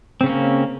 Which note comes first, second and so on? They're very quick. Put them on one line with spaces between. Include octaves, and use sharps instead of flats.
C4 C#3 C#4 A#3